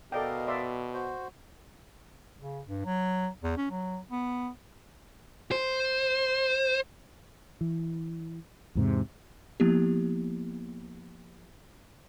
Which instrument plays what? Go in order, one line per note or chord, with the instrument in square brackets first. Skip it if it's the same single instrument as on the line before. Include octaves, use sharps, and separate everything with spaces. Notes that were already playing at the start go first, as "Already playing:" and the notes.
[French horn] B2 [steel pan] A4 D5 G5 [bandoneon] A#4 D#5 F5
[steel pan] D5 E5 C6
[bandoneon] F#4 C5
[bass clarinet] C#3
G2
F#3
E2
C#4
F#3
B3
[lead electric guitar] C5
[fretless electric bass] E3
E2 G#2 C3
[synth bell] F3 A#3 B3 E4 G4